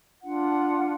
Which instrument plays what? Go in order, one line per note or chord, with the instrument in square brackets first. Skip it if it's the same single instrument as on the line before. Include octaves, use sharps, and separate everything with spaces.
[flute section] D4 F4 F#5